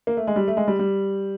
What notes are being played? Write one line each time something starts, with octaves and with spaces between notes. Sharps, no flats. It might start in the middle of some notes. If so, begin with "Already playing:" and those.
A#3
A3
G#3
G3
A3
G#3
G3
G3